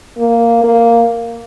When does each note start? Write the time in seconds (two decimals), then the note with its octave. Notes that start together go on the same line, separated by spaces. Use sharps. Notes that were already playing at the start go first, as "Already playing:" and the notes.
0.18 A#3
0.64 A#3